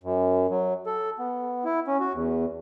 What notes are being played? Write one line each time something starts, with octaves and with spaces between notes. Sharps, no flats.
F#2
F#3
A4
B3
E4
C#4
F#4
E2